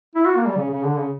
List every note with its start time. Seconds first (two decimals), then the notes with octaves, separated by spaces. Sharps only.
0.15 E4
0.26 F#4
0.36 A#3
0.46 G3
0.57 C#3
0.70 C#3
0.84 D3
0.98 C#3